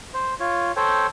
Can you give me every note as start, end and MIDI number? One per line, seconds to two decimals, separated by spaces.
0.14 0.35 72
0.40 0.72 65
0.40 0.72 73
0.76 1.07 69
0.76 1.07 72
0.76 1.07 73
0.76 1.07 79